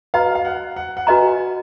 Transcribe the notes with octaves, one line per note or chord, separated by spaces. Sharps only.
F#4 B4 D#5 F5 A#5
F5
F#5
F#5
F#5
F#4 B4 D#5 G#5 A#5